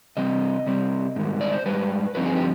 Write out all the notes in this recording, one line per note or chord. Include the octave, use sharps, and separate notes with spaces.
C3 G3 C4 D#5
C3 G3 C4
G#2 D#3 G3
D5
C5
G#2 D#3 G3 B4
G2 D3 F3 C4 D#4 B4
G#4
G4